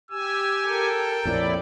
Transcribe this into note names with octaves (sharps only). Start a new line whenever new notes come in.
G4 G#5 E6
A4 A#4 G5
A#1 F2 A2 E4 D5